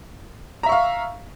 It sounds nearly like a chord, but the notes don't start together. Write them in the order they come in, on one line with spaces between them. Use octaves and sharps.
A#5 E5 C#6 F5